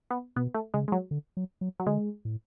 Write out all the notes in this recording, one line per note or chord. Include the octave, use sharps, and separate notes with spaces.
B3
B2 B3
A3
C#3 G#3
G#3
F#3
D3
F#3
F#3
F#3
D3 G#3
A2